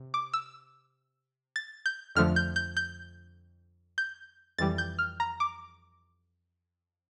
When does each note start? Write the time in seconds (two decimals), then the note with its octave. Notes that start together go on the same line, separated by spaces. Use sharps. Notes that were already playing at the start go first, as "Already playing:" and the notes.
Already playing: C3
0.14 D6
0.33 E6
1.56 A6
1.86 G6
2.15 F2 D3 F3 A3 F6
2.36 G6
2.56 G6
2.77 G6
3.98 G6
4.58 F2 E3 G3 A6
4.78 G6
4.99 F6
5.20 A#5
5.40 D6